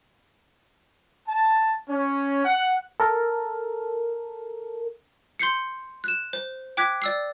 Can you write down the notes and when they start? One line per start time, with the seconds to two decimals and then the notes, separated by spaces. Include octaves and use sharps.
1.28 A5
1.89 C#4
2.45 F#5
3.00 A4 A#4
5.39 C6 G6 C7 C#7
6.04 F#6 E7
6.33 C5
6.77 G5 D6 F#6 G#6 B6
7.02 D5 E6 C7